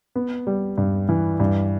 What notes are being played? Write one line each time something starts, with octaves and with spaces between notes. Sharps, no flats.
B3
G3
G2
E3
G2